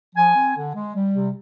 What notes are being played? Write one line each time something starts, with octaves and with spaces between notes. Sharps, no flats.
F3 G#5
C4
D3
G#3
G3
C3